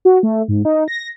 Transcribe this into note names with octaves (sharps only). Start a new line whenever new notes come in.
F#4
A3
G#2
D#4
A#6